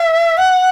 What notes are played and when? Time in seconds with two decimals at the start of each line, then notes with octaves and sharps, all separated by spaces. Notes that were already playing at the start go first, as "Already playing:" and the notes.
Already playing: E5
0.37 F#5